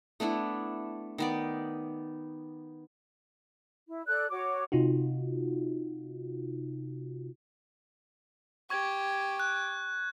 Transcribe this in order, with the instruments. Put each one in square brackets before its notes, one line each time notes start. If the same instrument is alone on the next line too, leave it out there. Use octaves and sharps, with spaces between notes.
[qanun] A3 B3 D4 E4
D#3 B3 D5
[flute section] E4
A4 D5 F#6
F#4 C#5 D6
[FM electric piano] C3 D#4 F4 F#4
[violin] G4 [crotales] C#6 G#6
[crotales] F#6